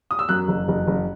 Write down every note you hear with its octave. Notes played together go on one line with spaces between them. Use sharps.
D#6
E6
F#2 F#6
F#1
F#1
F#1